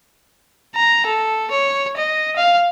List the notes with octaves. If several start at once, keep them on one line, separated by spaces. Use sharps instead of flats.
A#5
A4
C#5
D#5
F5